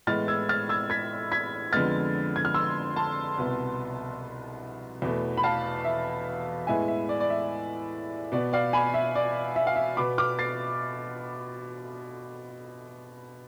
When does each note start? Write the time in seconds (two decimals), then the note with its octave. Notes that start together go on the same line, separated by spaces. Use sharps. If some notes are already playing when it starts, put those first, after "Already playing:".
0.07 A2 E3 G#3 B3 F6 A6
0.28 E6 G#6
0.49 F6 A6
0.69 E6 G#6
0.90 G#6 B6
1.32 G#6 B6
1.73 F2 D3 G#3 B3 F6 A6
2.36 G#6
2.45 F6
2.54 C6 E6
2.96 A5 C6
3.38 C2 B2 B3
5.02 E2 B2 A3
5.37 B5
5.43 F5 A5
5.85 E5
6.67 A2 E3 G#3 B3 E5 G#5
6.88 E5
7.09 D5
7.20 D5
7.30 E5
8.32 B2 B3 D5
8.53 D5 F5
8.73 G#5 B5
8.94 E5
9.15 D5
9.56 E5
9.67 F5
9.76 E5
9.97 B2 B3 B5 D6
10.18 D6 F6
10.39 A6 C7